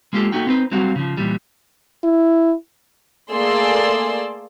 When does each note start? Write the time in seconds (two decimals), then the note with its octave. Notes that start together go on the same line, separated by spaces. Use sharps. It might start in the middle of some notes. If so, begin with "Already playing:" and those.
0.13 G#3 A#3 F4 G4 A4
0.32 A3 A#3 D#4 F#4 G5
0.47 C4 D#4 G4 A4 B4 C5
0.72 F#3 G3 C4 F#4 F5
0.96 C#3 F3
1.17 A#2 E3 G3
2.04 E4
3.32 A3 A#3 G#4 D5 C6 E6